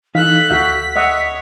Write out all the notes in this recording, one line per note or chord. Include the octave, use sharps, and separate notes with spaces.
E3 D#4 A4 F5 F#6 B6
D2 F#4 E5 F5 G6
C#5 D#5 E5 F#5